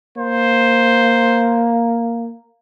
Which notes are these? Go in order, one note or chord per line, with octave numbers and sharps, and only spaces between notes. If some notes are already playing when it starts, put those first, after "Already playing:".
A#3 C5